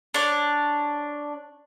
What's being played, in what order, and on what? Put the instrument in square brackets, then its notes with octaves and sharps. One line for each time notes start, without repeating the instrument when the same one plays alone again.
[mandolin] D4 C#5